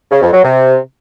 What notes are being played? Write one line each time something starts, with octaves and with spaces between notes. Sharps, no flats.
C#3
F2
F#3
C3